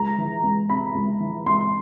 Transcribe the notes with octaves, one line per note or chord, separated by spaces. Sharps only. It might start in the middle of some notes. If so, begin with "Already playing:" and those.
Already playing: C#2 A#5
E3
C#2
C3 B5
C#2
E3
C#2 C6